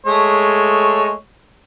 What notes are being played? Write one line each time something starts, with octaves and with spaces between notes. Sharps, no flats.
G#3 A3 C#5